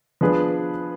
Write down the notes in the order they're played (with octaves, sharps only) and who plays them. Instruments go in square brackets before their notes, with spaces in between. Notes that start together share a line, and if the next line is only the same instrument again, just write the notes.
[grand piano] F3 B3 D4 G#4 B4